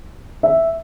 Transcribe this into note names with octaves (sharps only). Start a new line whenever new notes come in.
E5